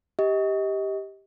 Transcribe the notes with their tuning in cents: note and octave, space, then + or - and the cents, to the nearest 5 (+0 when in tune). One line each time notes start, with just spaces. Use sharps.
G4 +0 D#5 +25